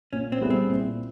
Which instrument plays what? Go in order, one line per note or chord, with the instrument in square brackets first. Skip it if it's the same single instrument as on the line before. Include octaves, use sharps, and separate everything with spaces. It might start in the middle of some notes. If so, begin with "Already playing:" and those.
[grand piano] A#2 [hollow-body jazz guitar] C#4
[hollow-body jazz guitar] C4
[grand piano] G3 B3 E4 G#4
[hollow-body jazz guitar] C4
[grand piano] A#2